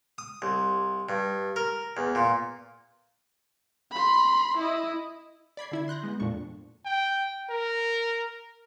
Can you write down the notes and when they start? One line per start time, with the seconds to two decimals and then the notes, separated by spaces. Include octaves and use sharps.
0.18 D#6
0.42 C2
1.09 G2
1.56 A#4
1.97 E2
2.15 A#2
3.91 B5 C6
4.58 E4 D#5
5.57 D5 B5 G#6 C7
5.71 D3 E4 G#6
5.88 C6 F#6 G6 A#6
6.03 G#3 B3
6.20 F2 A#2 D4 C#6
6.86 G5
7.50 A#4